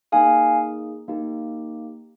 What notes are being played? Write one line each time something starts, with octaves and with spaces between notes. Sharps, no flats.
A#3 D#4 G#4 F5 G#5
A#3 D#4 G4